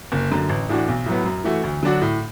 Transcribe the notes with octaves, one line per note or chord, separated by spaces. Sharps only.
F#1
F#2 D3
A1
A2 E3 D4 F#4
B1
A2 F#3 B3
F#2
E3 A3 F#4
D2
D3 F#3 D4 F#4
A2